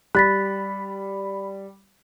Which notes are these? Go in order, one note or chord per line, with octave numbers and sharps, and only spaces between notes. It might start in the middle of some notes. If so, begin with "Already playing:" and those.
G3 B5 F#6 A6 B6